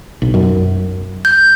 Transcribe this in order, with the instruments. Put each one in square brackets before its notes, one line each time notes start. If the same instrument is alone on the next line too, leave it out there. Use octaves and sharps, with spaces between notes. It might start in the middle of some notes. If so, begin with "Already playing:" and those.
[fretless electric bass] B1
F#2
[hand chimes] G6